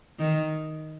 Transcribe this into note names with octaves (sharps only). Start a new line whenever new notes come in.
D#3